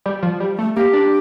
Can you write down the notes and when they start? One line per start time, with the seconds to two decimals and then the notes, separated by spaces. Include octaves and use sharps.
0.06 G3
0.22 F3
0.40 G3
0.58 A3
0.76 A#3 G4
0.93 D4